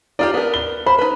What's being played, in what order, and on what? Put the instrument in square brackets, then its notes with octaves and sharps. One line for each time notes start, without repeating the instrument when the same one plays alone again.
[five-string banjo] D#4 F4 G4 [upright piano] D5
[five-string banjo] B3 A#4
[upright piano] G7
[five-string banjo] C5 [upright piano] B5
[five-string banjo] D#4 B4